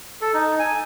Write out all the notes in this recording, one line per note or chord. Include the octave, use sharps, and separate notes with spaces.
A4
D#4
G#5